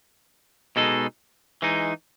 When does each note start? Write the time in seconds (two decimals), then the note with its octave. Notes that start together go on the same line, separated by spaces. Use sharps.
0.76 B2 G#3 D#4 A4
1.62 E3 G#3 D#4